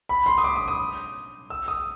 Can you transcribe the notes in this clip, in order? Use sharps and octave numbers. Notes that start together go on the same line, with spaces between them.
B5
C6
D#6
D6
D#6
D#6
E6
D#6